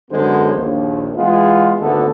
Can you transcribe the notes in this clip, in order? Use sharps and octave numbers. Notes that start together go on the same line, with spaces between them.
F#2 D3 F#3 G#3 B3 C5
A#1 D#2
E3 G#3 B3 F4
G#1 D2 G#2 D3 B3 A4